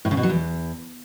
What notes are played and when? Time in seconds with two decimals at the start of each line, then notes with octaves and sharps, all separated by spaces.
0.05 A2
0.11 C#3
0.17 B2
0.23 F#3
0.29 E2